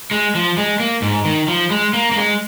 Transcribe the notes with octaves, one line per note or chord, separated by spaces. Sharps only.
G#3
F3
G#3
A#3
G#2
D#3
F3
G#3
A#3
A#3
G#3